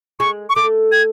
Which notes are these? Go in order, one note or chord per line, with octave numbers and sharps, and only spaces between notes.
G#3 C#6
C#6
A3 D6
G#6